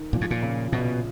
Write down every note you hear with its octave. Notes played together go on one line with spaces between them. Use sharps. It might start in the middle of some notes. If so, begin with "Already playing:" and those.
Already playing: D#3
A#2 F3
G#2
A#2
C#3
A#1 B2